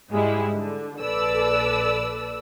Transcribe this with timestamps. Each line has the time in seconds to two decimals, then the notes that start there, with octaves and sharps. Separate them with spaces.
0.10 G#2 G3 G#3 E4
0.53 D3
1.01 A#1 A4 B4 D5 E6